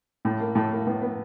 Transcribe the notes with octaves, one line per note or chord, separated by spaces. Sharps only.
A2 A3
A#3
A2 A3
A#3
A2 B3
B3